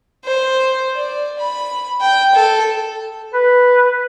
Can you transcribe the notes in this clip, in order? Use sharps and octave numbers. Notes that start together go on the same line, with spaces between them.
C5
D5
B5
G5
A4
B4